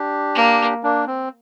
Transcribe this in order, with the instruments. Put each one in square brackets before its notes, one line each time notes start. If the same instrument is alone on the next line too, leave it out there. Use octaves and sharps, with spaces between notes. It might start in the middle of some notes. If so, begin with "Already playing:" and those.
Already playing: [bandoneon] D4 G4
[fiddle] A#3
[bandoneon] A#3 D4
C4